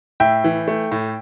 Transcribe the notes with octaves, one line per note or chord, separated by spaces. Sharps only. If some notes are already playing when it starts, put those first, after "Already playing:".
A2 E5 G5
E3
A3
A2